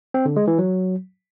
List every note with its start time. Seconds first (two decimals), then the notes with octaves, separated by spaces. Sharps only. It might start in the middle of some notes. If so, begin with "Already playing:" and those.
0.14 C4
0.25 D3
0.36 G#3
0.47 E3
0.59 F#3